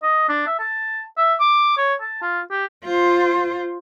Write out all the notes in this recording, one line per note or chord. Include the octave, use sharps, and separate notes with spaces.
D#5
D4
E5
A5
E5
D6
C#5
A5
F4
G4
F4 C5